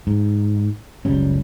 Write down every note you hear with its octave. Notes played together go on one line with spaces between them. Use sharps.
G#2
F#1 C#2 G3 C#4